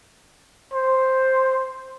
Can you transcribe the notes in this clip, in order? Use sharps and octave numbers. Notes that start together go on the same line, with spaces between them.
C5